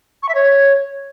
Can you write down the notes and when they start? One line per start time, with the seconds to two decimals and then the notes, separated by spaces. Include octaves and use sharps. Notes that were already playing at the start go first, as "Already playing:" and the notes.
0.22 C#6
0.28 E5
0.34 C#5